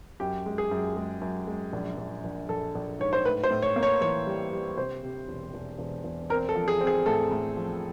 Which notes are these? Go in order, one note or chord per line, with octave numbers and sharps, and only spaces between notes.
F#2 G4
G#3
G#4
F#2
G#3
F#2
G#3
A#1
A#1
A#1
A#1 A4
A#1
G#2 C#5
C5
A2 B4
C5
A2
C#5
A#3
C#5
E3 C#5
G3
G3
C3 C5
C3
E1
E1
E1
E1
C4 A#4
A4
F3
G#4
C4
G#4
A2 A4
A2
F3